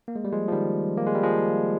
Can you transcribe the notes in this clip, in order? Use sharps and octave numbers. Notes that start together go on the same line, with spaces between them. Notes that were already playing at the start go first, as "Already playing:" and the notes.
A#3
G#3
G3
F3 G#3
F3
D#3 G3
A#3
G#3
G3
F3 G#3